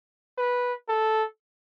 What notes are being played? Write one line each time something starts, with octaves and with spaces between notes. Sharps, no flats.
B4
A4